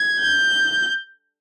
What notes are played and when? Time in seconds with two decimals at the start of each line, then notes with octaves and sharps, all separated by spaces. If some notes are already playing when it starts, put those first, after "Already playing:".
Already playing: G#6
0.21 G6